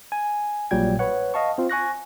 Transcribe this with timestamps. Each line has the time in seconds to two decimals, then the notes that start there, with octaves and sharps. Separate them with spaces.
0.12 G#5
0.71 A#1 A#2 F#3 G3 G5 G#6
0.99 B4 C#5 F#5
1.34 D#5 F5 A5 C#6
1.58 C4 F4
1.70 G#5 C#6 F#6 A#6